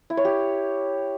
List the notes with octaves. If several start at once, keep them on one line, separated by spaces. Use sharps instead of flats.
E4
C#5
G4